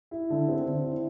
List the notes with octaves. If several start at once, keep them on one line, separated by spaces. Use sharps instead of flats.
E4
D3
C4
D3
E4